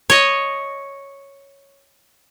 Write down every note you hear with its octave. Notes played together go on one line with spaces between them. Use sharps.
C#5 D#5